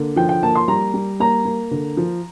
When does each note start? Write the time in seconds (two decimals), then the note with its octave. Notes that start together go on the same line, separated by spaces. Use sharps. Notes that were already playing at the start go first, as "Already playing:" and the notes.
Already playing: D3 A#3
0.16 F3 G5
0.29 G5
0.43 A#3 A5
0.56 C6
0.68 G3 A#5
0.94 G3
1.20 A#3 A#5
1.45 A#3
1.71 D3
1.97 F3